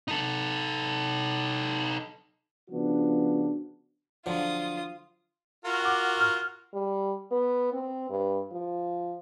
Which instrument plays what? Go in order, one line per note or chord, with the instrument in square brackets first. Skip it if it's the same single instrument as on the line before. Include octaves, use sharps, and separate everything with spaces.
[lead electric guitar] D#4 A4
[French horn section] C#3 F3 B3 D4 F#4
[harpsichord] D3 F3 F#3 [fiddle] F4 D#6
[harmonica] F4 F#4 A#4
[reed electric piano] F#5 D6
F6
[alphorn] G3
B3
C4
G2
F3